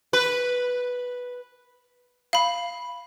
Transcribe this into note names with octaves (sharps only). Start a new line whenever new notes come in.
B4
F5 B5